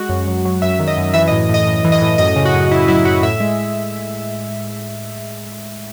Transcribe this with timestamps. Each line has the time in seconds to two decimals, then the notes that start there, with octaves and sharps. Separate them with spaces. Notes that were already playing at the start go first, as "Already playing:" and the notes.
Already playing: G#3 F#4
0.09 F#2
0.27 F#3
0.45 F#3
0.62 F#2 E5
0.79 D#3
0.88 D#5
0.97 F#2
1.14 E3 E5
1.28 A2 D#5
1.49 A2 D#5
1.66 A2
1.85 E3
1.92 D#5
2.02 A2
2.18 F#2 D#5
2.36 C#3
2.46 F#4
2.54 F#2
2.71 F#2 E4
2.88 F#3 E4
3.05 F#2 F#4
3.23 A2 E5
3.40 G#3